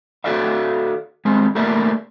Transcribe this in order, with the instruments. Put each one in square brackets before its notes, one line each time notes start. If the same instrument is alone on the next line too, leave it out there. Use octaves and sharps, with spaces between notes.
[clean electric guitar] F#4 A4 D5 E5 F5
G3 G#3 C4
A3 A#3 G4 A#4 D5 E5